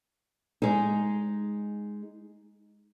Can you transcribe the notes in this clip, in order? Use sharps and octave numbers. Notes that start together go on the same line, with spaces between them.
G#3 D#4